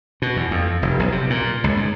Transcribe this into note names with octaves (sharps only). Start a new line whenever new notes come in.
B2
E2
F2
F1
B1
C3
A#2
C#2
G#2